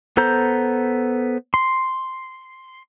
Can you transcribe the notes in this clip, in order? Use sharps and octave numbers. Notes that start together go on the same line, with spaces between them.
B3 A4 C5 A#5 G6
C6